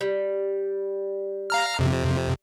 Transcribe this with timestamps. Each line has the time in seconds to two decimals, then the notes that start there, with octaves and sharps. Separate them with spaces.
0.01 G3
1.50 F5 A#5 F6
1.79 F2 C3